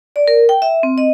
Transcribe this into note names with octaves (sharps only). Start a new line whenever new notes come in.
D5
A#4
G5
E5
C4
D#5